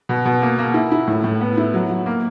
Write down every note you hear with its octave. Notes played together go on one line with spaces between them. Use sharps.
B2
B2
A#3
A#3
E4
E4
A2
A2
B3
E4
F#3
F#3
A#3